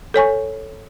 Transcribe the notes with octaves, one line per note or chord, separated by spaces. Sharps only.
A4 C#5 G#5 C#6